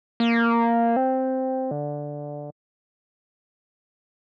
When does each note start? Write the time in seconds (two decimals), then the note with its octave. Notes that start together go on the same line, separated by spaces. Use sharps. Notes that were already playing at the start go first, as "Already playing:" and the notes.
0.20 A#3
0.96 C4
1.71 D3